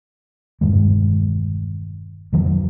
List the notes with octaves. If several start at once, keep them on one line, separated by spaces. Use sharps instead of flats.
E1 G2 D#3 G#3
F2 D#3 F#3